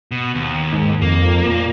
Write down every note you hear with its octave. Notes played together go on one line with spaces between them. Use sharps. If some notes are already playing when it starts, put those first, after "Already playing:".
B2
D#2
G#2
F2 A#3
A#2